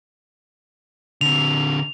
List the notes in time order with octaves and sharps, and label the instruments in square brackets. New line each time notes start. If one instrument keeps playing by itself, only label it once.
[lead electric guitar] D3 C4 [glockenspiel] F7